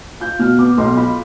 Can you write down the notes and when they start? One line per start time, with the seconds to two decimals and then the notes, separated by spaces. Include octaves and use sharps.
0.20 F4 G6
0.39 B2 F6
0.58 B3 D6
0.78 B1 C6
0.97 F4 B5